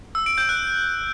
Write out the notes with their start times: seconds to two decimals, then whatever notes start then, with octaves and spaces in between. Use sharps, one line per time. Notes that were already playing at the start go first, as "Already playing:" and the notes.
0.15 E6
0.26 D7
0.38 G6
0.49 F#6